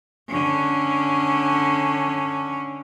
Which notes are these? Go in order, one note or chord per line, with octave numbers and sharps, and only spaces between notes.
D3 C#4